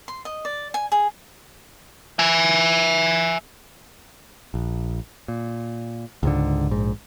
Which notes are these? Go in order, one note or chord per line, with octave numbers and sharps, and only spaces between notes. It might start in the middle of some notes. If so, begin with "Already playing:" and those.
C6
D#5
D5
G#5
G#4
E5 G#5
A#1
A#2
C#2 G#2 D3
A#1 G#2